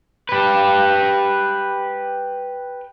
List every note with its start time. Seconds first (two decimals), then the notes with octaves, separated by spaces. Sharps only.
0.29 G4 B4